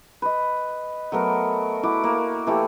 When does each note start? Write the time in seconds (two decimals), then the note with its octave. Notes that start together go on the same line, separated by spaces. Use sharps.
0.22 B4 D#5
1.12 F#3 A3 B3 A#4
1.83 E4 F#4 D6
2.04 A#3
2.47 E3 A3 G4